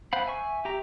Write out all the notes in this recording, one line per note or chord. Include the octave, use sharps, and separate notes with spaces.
C5 F5 F#5 B5
E5 G#5 C#6
G4 E5 A#5